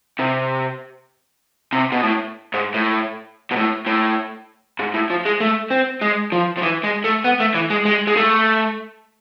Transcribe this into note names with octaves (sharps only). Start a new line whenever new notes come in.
C3
C3
B2
A2
G#2
A2
B2
A2
A2
G#2
A2
F3
G#3
A3
C4
G#3
F3
F3
E3
G#3
A3
B3
A3
E3
G#3
G#3
G#3
A3